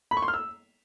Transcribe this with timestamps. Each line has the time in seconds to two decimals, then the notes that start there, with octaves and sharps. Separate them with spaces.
0.11 B5
0.17 C#6
0.22 C6
0.28 F6
0.34 E6